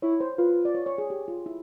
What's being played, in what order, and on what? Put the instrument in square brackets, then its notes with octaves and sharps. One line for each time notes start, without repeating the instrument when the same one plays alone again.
[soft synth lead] E4 [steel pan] C#5
[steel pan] C5
[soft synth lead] F4 [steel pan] B4
[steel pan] D5
C#5
C#5
G#4
G4
F4
E4